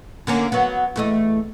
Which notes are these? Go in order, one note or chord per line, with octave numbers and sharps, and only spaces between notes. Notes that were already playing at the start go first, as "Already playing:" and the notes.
D3 A#3 C#4
F#3 B3
E2 A3 D#5